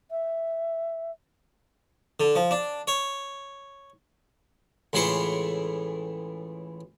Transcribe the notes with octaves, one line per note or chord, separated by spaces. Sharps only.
E5
D3
F3
D4
C#5
C#2 A2 E3 G#4 C5 C#6